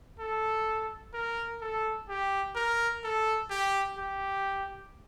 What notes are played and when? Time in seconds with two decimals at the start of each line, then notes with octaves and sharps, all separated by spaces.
0.19 A4
1.13 A#4
1.61 A4
2.09 G4
2.56 A#4
3.04 A4
3.50 G4
3.98 G4